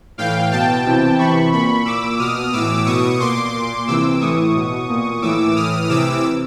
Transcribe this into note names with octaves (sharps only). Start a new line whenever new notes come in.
A2 E3 F5 G5
B2 G5 A5
C3 E3
C3 E3 B5 C#6
A#2 B5 C#6
A#2 D6 E6
B2 D#6 F6
A2 E3 D6 E6
B2 C#6 D#6
A#2 C6 D6
A#2
C3 E3 D6 E6
A2 E3 C#6 D#6
B2
A#2
A2 E3 D6 E6
A2 E3 D#6 F6
C3 E3 D6 E6